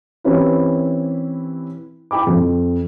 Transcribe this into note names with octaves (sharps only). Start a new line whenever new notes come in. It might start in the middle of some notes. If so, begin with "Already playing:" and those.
E3 C4 C#4 E4 G4 B4
E4 G5 B5 D6
F2